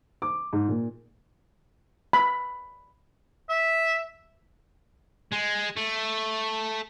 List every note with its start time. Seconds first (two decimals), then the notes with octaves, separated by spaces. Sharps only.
0.22 D6
0.53 G#2
0.68 A#2
2.13 B5
3.49 E5
5.33 G#3
5.77 A3